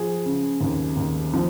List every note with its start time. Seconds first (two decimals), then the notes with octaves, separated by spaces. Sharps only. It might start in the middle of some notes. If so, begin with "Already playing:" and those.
Already playing: F3 G#4
0.25 C#3
0.61 D#2
0.97 D#2
1.33 F3